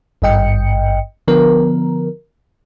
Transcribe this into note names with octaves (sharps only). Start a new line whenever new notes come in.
G#1 G2 D#5 G5 C#7
D3 F3 B3 A#4